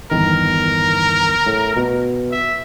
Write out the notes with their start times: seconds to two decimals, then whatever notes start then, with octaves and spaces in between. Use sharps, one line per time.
0.11 G1 E2 D#3 A#4
1.46 A2
1.77 B2
2.32 E5